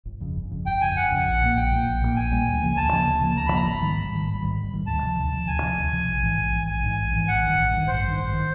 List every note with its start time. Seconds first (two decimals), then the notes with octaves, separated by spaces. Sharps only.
0.05 G1
0.20 F2 C#3
0.36 G1
0.51 F2 C#3
0.66 G1 G5
0.81 F2 C#3 G#5
0.96 G1 F#5
1.11 F2 C#3
1.26 A#1
1.42 A#2 G3 A#3
1.56 A#1 G5
1.71 A#2 G3 A#3
1.86 A#1
2.02 A#2 G3 A#3
2.16 A#1 G#5
2.31 A#2 G3 A#3
2.46 D2
2.61 C#3 F3 A#3
2.76 D2 A5
2.92 C#3 F3 A#3
3.07 D2
3.21 C#3 F3 A#3
3.37 D2 A#5
3.47 B5
3.52 C#3 F3 A#3 A#5
3.66 G#1 B5
3.81 G#2 D#3 G3
3.97 G#1
4.12 G#2 D#3 G3
4.27 G#1
4.42 G#2 D#3 G3
4.57 G#1
4.72 G#2 D#3 G3
4.86 D2 A5
5.03 C3 F3
5.17 D2
5.32 C3 F3
5.47 D2 G#5
5.63 C3 F3
5.77 D2
5.92 C3 F3
6.08 A#1
6.22 G#2 E3
6.37 A#1
6.52 G#2 E3
6.67 A#1 G#5
6.83 G#2 E3
6.98 A#1
7.13 G#2 E3
7.28 A1 F#5
7.43 G2 D#3
7.57 A1
7.72 G2 D#3
7.87 A1 C5
8.02 G2 D#3
8.17 A1
8.33 D#3